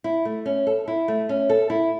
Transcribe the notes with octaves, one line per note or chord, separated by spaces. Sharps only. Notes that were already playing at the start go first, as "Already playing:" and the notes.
E4
A3
C#4
A4
E4
A3
C#4
A4
E4